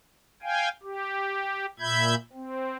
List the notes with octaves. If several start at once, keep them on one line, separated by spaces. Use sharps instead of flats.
F5 G5 G#5
G4
A#2 E5 B5 G6 G#6
C4